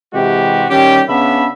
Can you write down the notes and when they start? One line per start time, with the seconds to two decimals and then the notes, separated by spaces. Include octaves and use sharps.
0.14 C3 E3 G#3 F#4 G4
0.70 D#3 G3 C#4 G4
1.09 C#3 B3 D4 E5 B5